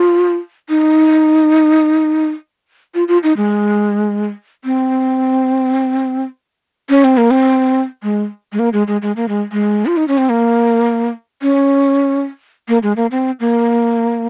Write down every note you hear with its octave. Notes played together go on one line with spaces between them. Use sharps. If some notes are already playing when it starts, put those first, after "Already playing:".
Already playing: F4
D#4
F4
F4
D#4
G#3
C4
C#4
C4
A#3
C4
G#3
G#3
A#3
G#3
G#3
G#3
A#3
G#3
G#3
F4
D#4
C#4
C4
A#3
C#4
A#3
G#3
A#3
C4
A#3